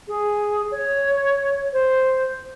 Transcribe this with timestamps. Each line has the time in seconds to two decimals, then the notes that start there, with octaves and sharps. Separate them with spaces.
0.08 G#4
0.71 C#5
1.73 C5